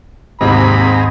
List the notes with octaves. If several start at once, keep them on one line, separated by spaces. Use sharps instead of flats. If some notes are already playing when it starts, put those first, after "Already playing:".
D#2 G#2 C3 D#3 C4 G#4 A#5 B5